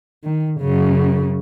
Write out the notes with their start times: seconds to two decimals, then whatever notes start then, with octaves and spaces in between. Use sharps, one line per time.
0.24 D#3
0.60 F#2 C#3